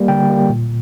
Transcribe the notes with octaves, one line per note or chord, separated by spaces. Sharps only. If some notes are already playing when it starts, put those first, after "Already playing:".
Already playing: G3 A#3
D3 G5
G3 A#3
A#2